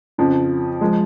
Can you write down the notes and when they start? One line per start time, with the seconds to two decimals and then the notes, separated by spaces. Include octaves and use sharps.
0.18 F2 C#3 F3
0.81 F3 G#3